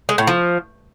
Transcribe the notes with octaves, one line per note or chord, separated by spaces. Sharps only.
G#3
A2
F3